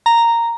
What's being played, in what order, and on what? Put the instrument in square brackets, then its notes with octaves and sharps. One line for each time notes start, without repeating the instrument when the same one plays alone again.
[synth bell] A#5